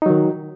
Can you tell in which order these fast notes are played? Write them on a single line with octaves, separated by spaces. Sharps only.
D#4 F#3 D#3